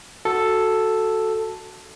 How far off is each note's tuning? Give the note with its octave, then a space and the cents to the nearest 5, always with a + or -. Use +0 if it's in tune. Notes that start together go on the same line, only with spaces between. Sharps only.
F#4 +0 A4 +0